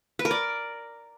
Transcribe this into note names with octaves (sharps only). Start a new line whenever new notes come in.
B4
A#4
D5